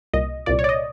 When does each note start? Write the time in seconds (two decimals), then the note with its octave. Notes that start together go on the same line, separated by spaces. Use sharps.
0.13 C2 A#2 D#5
0.46 C2 A#2 D5
0.59 C#5
0.64 D5
0.69 D#5